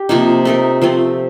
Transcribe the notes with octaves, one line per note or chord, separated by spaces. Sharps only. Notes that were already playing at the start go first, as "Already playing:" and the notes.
Already playing: G4
C3 F3 A#3 D#4
A3 D#4 A#4
F3 A3 C4